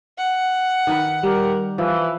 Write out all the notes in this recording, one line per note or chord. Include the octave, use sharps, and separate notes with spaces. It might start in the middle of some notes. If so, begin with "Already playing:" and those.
F#5
D#3 D#4 B4
G3 G4 A#4
E3 F3